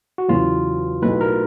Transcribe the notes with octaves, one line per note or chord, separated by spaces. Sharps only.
F#4
E2 C#3 F#3 F4
B1 A2 F#3 A3 B4
A#4